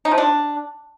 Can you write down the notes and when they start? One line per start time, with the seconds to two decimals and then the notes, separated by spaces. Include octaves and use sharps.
0.05 D#4
0.11 F3
0.18 D4